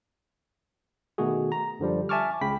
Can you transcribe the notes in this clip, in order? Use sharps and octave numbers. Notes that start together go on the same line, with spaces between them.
B2 D#3 A3 F#4 G#4
A#5
F#2 D3 F3 G3
E5 G#5 A5 C#6 D6 F6
C#2 C#3 G5 B5 B6